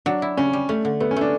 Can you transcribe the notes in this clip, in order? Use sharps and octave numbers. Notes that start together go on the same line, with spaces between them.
F#3 D4
E4
C#3 C#4
G3
A3 C#4
D3
A3 B3
C#4
A3 D4